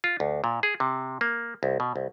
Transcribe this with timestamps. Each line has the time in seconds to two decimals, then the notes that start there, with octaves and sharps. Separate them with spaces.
0.04 F4
0.20 D2
0.44 A#2
0.63 G#4
0.80 C3
1.21 A#3
1.63 C2
1.80 B2
1.96 C2